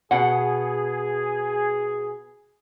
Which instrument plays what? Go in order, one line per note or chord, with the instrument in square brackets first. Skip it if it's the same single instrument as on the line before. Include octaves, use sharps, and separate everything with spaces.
[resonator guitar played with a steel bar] B2 F#5 [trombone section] G#4